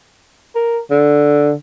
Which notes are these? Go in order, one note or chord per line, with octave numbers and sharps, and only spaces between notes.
A#4
D3